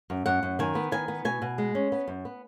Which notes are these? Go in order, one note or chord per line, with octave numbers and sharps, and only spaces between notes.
F#2
F#2 F#5
F#2
D#3 G#5
B3
D#3 G#5
B3
B2 G#5
B2
G#3
C#4
B3
F#2
B3